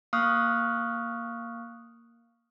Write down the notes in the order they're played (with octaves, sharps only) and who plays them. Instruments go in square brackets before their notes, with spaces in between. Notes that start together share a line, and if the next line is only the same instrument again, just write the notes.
[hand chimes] A#3 F5 C#6 D#6 F6 F#6